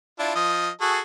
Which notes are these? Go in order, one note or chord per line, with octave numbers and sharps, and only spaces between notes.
D4 E4 F4
F3 D#5
F#4 G#4 A4